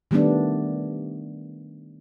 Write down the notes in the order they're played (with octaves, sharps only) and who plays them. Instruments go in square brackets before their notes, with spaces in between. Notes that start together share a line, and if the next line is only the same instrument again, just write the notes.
[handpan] D#3 G3 A3 B3 D4